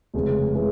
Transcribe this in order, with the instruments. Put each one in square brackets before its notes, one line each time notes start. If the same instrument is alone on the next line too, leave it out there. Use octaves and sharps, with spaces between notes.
[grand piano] F1 F2 C#3 E3 G#3
C#3 E3 G#3